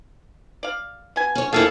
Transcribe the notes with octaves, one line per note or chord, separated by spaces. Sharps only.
D5 F5
B2 G#5
C#4 C#5
F2 A#3 E4 G#4 A4 F5